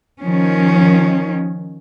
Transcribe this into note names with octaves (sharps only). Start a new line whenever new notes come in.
D#3 F3 C#4